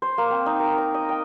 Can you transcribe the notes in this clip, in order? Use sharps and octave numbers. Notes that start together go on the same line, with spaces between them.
C5
A#3
C4
D#4
A#4
A#5
D#5
G5